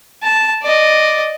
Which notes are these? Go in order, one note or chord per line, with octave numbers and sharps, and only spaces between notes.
A5
D5 D#5